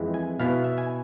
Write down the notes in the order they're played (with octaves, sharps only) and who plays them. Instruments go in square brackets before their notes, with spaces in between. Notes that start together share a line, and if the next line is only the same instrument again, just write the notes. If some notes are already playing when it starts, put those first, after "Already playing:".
Already playing: [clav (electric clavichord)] F2 E3 G#3 C4 E4
G#5
B2 B3 E4 F5
E5
G#5